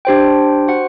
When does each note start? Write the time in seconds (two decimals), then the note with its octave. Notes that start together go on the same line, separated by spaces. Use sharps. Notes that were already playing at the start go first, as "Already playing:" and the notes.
0.05 D4 G4 C5 G5
0.68 F#4 C5 F#5